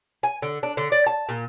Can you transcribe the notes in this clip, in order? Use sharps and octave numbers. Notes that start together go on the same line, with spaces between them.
G#5
D3
D4
D3
D5
A5
A#2